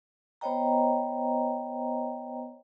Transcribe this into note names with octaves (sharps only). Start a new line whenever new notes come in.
B3 C5 C#5 D#5 G5 A#5